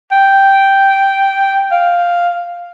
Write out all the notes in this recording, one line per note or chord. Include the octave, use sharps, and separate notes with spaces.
G5
F5